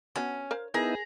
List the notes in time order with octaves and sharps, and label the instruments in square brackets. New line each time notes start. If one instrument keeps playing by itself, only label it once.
[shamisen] B3 F#4 [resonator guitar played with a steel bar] C#4
[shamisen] A#4 C5 F5
[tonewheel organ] B3 D#4 E4 [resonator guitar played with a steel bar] G#4 [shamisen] A#4 [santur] A#5